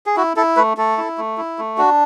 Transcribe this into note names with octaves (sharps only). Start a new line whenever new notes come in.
G#4
E4 F#4
E4 A4
A3 B4
A3 A4
E4
A3
E4
A3
D4 F#4